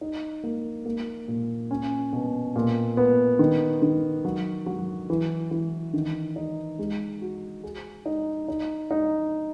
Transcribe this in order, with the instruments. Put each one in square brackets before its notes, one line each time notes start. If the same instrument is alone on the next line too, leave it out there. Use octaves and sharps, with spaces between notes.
[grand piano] D#4
A#3
A#3
A#2
C#4
B2
A#2
B3
D#3
D#3
F#3
F#3
E3
E3
D#3
D#4
G#3
F#4
G#4
D#4
D#4
D#4